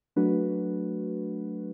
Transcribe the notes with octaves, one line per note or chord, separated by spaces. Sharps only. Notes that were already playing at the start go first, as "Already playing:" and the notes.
F#3 A3 D4 F#4 B4